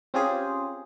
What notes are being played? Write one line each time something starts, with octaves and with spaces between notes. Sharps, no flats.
C4 C#4 F4 G4 G#4 C5